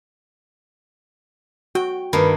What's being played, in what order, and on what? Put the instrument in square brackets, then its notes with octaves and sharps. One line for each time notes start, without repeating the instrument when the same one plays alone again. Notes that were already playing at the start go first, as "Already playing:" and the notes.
[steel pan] F#4 [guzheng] G5
[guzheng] G2 D#3 A#3 [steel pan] A#4 [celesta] B4 B5